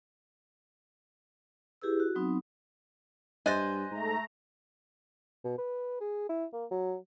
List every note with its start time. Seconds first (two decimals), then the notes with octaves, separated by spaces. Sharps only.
1.82 E4 G4 G#4 B4 E6
2.00 F#4
2.16 F#3 B3 C4 D#4
3.46 G2 C5 D#5 G#5 F#6 A6
3.91 G#2 A3 A#5
5.44 B2
5.58 B4
6.01 G#4
6.29 E4
6.53 A#3
6.71 F#3